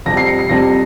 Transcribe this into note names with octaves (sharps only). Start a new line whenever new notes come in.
F2 C3 G3 A#6
C7
C#7
C7
F2 C3 G3 A#6